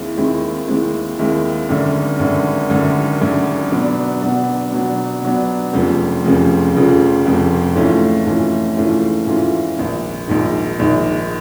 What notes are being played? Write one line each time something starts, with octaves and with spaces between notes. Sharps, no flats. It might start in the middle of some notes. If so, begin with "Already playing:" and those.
Already playing: D#2 D#3 G#3 C4 E4
D#2 D#3 G#3 C4 E4
D#2 D#3 G#3 C4 E4
D#2 D#3 G#3 C4 E4
G#1 F#2 D3
G#1 F#2 D3
G#1 F#2 D3
G#1 F#2 D3
B2 F#3 B3 D4
B2 F#3 B3 D4
B2 F#3 B3 D4
B2 F#3 B3 D4
F1 F2 C#3 F3
F1 F2 C#3 F3
F1 F2 C#3 F3
F1 F2 C#3 F3
G#2 E3 A3 C#4 F4
G#2 E3 A3 C#4 F4
G#2 E3 A3 C#4 F4
G#2 E3 A3 C#4 F4
A#1 G#2 D#3
A#1 G#2 D#3
A#1 G#2 D#3